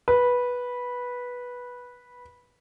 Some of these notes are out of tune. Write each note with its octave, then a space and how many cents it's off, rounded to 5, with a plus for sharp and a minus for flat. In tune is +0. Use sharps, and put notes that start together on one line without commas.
B4 -10